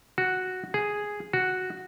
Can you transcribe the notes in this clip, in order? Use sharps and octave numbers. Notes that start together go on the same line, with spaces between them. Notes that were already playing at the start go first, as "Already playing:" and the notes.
F#4
G#4
F#4